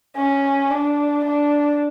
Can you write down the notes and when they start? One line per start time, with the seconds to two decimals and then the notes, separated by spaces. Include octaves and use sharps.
0.16 C#4
0.70 D4
1.25 D4